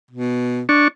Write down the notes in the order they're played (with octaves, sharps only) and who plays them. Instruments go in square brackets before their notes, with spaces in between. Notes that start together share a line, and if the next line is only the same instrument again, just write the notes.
[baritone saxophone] B2
[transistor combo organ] D4 C#6